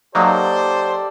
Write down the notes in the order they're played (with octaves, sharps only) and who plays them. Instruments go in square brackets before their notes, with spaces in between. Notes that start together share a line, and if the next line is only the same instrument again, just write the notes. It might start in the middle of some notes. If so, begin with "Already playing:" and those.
[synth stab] F#3 A#3 D#4 [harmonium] G4 A4 D5 [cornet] C5